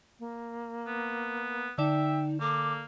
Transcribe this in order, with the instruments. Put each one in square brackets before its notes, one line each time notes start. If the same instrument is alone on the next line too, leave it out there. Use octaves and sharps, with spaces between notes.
[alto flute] A#3
[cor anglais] B3
[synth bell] D3 D5 E7 [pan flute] D#4 [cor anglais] E5 [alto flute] G5
[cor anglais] A#3 [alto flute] A4 [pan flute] D6